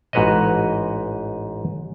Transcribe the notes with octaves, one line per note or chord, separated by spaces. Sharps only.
A1 G#2 F#4 B4 C#5 D#5